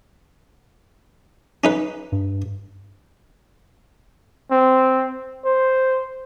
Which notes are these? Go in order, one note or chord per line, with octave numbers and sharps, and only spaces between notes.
C#4 D#4 B4
G2
C4
C5